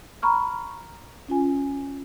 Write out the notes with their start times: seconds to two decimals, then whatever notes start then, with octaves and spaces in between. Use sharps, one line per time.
0.22 A#5 B5 C#6 F6
1.29 C#4 F4 G#5